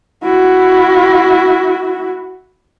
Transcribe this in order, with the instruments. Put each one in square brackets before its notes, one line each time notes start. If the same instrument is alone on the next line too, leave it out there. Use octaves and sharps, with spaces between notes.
[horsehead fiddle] E4 F#4